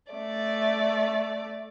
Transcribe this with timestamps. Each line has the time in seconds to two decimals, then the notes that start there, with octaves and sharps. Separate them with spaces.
0.12 A3 D5